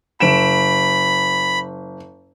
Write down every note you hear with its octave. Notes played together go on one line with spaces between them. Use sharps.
F#1 B5 D7 E7